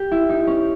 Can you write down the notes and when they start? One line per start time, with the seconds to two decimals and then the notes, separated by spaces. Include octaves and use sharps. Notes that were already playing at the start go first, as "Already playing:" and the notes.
Already playing: G4
0.12 E4
0.29 D#4
0.47 C#4